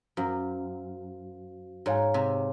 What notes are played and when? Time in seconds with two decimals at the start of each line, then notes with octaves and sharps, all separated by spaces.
0.17 F#2 F#4 C5 F5
1.86 G#2 G#4 C#5 F5 G#5
2.14 C3